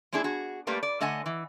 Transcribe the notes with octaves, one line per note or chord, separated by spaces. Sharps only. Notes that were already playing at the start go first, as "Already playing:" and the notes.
G#3 B3 D4 E4 G#4
F#4 G#4
G3 A3 A#3 G4 B4 D5
D5
D3 A3 D#5 F#5 G#5
E3